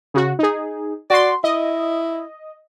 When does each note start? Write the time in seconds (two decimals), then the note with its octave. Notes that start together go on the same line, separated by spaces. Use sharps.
0.14 C#3 F#4
0.39 D#4 G#4
1.10 F#4 D5 C6
1.44 E4 D#5